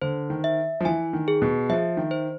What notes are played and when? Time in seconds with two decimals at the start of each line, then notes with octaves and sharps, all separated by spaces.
0.02 D3 C5
0.30 D#3
0.44 E5
0.80 F3
0.85 E3 G#5
1.13 D#3
1.28 G#4
1.42 B2
1.69 F3 E5
1.97 D#3
2.11 C5